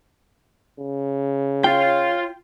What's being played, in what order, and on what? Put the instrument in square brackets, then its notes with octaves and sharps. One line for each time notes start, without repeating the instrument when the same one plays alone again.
[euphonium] C#3
[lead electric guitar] F4 F5 [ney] C#5 [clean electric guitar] G5